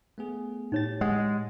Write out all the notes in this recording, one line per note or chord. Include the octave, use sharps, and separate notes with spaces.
A3 B3 G#4
A2 D#4 G4 C#5 A6
G#3 F#5